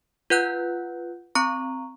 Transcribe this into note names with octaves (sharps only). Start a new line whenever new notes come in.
F4 B4 F#5 F#6 G6
C4 A#5 C#6